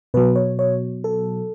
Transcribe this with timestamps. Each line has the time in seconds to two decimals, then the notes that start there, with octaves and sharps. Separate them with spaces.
0.14 B2 F#3 B4
0.36 C#5
0.59 C#5
1.04 A4